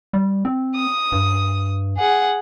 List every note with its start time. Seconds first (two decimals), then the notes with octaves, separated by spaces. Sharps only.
0.13 G3
0.45 C4
0.75 D#6
1.12 G2
1.97 G#4 F#5